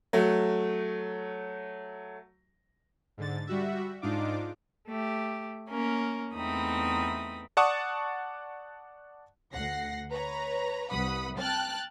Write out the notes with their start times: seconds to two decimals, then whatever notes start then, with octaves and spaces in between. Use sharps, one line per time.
0.13 F#3 A3
3.17 G#2 D3 A6
3.47 G3 F#4 E5
4.02 G#2 D4 D#4 F4 D6
4.87 A3 G4
5.68 A#3 C#4 A#4
6.34 E2 A3 C4 D#4 B5 D#6
7.57 D5 F#5 A5 C#6 D#6
9.53 D2 F#5 A#6 C7
10.11 B4 C#5 A#5
10.90 C2 B4 F#5 B5 D#6
11.39 G5 A5 F6 F#6 A6